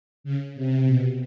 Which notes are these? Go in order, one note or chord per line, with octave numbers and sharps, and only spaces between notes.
C#3
C3
B2